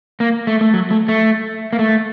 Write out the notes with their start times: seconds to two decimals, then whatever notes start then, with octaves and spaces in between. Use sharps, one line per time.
0.20 A#3
0.47 A3
0.61 A3
0.74 F#3
0.91 A3
1.08 A3
1.73 A#3
1.79 A3